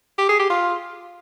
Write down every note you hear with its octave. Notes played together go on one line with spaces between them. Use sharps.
G4
G#4
G4
F4